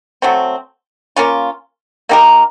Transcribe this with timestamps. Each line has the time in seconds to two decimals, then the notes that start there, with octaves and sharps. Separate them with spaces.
0.22 F#3 A3 C4
1.16 A#3 C#4 F4
2.09 A#3 D#4 G4 A#4